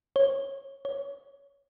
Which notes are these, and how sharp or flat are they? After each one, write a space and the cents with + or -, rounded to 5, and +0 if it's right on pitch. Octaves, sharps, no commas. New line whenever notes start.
C#5 -20
C#5 +15